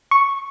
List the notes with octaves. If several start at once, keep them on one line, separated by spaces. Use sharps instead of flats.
C#6